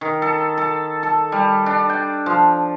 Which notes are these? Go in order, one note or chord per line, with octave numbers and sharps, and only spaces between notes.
D#3
A4
A4
A4
G3
D4
G5
F3